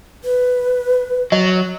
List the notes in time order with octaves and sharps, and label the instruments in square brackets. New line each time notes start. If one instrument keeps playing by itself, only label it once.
[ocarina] B4
[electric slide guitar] F#3 [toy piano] D#5